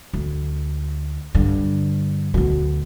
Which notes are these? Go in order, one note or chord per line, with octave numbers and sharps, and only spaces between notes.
D2
G2 D3
D2 B2